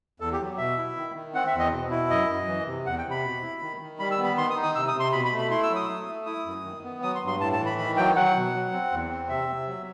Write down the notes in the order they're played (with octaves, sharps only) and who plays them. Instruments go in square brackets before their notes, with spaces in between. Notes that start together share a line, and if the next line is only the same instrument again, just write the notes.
[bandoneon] E2 A4
G4
F#3
B2 E5
E4
D#3
D#3
C4 F#5
E5
E2
D#5
B2
E4
F#2 D#5
F#2
E3
C3
E2 F#5
G5
C3
B5
B2
E4
D#3
D#3
G3 B5
E6
B3
B5
D#3 C6
D#6
D#4
D#6
C3 E6
D#6
C3
C6
B2 B5
B5
A3
B5
E4 C6
E6
F#3
D#6
A3
A3
E4 D#6
F#2
D#3
B3
F#3 D#6
C6
G2
C6
A2 A5
A5
E3
B5
D#3 B5
F#3 G5
F#3 F#5
B2
F#3
C4
E2
C4
C3 E5
C3
F#3